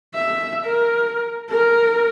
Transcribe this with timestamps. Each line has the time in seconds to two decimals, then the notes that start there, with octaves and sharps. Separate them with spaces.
0.15 E5
0.65 A#4
1.50 A#4